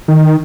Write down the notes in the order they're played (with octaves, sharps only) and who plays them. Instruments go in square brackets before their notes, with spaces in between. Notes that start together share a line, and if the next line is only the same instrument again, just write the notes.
[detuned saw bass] D#3